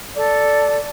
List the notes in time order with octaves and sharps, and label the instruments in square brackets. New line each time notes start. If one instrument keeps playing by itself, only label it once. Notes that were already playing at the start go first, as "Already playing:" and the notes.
[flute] A4 [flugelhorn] D5